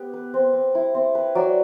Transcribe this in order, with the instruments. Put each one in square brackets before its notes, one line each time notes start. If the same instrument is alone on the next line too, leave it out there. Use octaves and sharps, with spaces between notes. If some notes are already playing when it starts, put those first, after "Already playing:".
Already playing: [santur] B3 G4 [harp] C5
[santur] B4
C4
C4
E4
C4
B4
[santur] F#3 [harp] D5